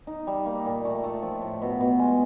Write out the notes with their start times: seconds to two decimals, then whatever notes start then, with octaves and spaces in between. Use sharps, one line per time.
0.07 D#4
0.27 G3
0.46 A#3
0.66 A#2
0.85 A3
1.04 A3
1.22 F3
1.41 A2
1.62 B2
1.81 B2
1.99 G#3